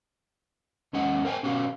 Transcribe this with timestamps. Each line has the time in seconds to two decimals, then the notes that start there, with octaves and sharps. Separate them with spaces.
0.93 E2 G#3 C#4 D#5 F#5
1.25 A#4 C5 G5 G#5
1.43 B2 C#4 F#4 G4 C#5 F5